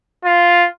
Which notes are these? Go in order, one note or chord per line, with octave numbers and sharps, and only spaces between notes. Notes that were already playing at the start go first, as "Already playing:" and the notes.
F4